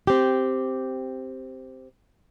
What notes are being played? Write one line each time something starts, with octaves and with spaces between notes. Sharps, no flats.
C4 G4